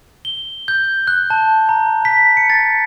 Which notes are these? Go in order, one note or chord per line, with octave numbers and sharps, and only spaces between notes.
G7
G6
F#6
A5
A#5
B6
C#7
A6